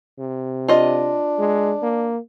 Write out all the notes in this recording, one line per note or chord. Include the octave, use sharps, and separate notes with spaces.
C3
D4 F4 D#5
G#3
A#3